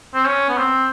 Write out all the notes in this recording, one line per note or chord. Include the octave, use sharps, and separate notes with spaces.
C4
C#4
B3
C4